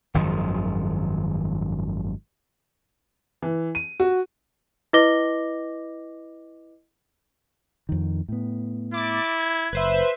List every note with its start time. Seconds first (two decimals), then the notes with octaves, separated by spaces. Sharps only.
0.14 G#1 F#2 D#3 F3
3.42 E3
3.75 D#7
4.00 F#4
4.93 E4 B4 D#5 D6 A#6 G7
7.89 F2 D#3
8.29 A2 B3
8.94 E4 D6 A6
9.40 G#6
9.73 F#1 B4 C5 E5